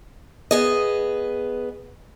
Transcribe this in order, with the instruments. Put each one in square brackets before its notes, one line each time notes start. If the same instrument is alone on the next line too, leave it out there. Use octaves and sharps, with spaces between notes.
[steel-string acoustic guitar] B3 G#4 D#5